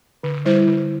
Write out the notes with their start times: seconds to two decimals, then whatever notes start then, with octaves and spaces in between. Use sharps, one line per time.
0.23 D3
0.45 G3 E4 C5
0.67 D3